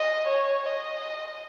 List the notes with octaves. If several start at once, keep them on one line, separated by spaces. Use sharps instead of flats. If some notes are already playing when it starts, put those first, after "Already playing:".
Already playing: D#5
C#5
D#5